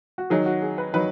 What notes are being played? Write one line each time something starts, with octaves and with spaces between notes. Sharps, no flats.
F#4
D#3 F#3 D#4 G#4
F#4
G#4
B4
D#3 F#3 D#4 B4